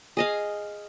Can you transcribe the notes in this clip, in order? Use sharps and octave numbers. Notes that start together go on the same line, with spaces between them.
G#4 D#5 F5